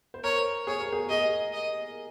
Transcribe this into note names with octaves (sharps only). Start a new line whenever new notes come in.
C5
A#4 C#5
G#4 C#5
A#4
G#4
G#4 D#5
D#5